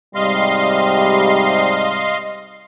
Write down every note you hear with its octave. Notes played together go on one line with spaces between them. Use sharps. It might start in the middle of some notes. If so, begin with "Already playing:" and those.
G#2 C3 G3 D#5 F5 C6